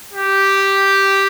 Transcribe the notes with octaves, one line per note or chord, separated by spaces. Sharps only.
G4